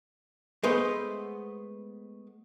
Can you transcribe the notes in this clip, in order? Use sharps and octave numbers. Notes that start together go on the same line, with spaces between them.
G#3 A3 B3 B4 C5